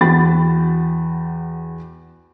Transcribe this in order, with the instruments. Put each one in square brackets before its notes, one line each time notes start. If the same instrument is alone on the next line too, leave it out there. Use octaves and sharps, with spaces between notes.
[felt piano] E2 F#4 G5 B5 A6